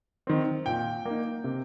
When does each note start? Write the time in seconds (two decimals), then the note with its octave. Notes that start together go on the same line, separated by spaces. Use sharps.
0.27 D#3 C4
0.66 A#2 G5
1.06 A#3 D#4
1.44 C3